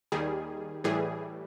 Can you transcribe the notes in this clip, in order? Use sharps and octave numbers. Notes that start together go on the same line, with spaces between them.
D#2 D#3 G3 G#4
A2 E3 G3 G#4